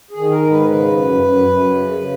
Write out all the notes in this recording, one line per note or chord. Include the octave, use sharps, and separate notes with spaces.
G#4
D#3
A#4
G#2
B4
C#3 B4
F#2
F#2
F#2
C#3
C#3